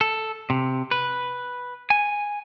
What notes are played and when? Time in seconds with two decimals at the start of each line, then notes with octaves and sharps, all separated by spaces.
0.01 A4
0.50 C3
0.91 B4
1.90 G#5